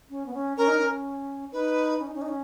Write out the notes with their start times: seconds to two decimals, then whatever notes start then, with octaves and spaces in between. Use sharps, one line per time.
0.10 C#4
0.26 B3
0.34 C#4
0.57 C#4 A#4
0.68 D#4
0.77 C#4
1.53 D#4 B4
2.00 C#4
2.07 D#4
2.15 C#4
2.22 D#4
2.28 C#4